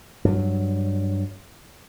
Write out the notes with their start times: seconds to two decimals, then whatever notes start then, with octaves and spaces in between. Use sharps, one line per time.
0.25 G2 F#3